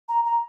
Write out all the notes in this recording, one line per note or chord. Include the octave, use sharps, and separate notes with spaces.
A#5
A#5